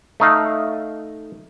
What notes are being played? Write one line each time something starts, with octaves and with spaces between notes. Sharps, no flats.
A3 D#4 F5